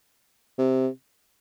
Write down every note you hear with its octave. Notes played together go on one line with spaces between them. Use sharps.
C3